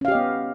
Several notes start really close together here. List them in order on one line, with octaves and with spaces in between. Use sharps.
C#4 F5 G4 D#5 B3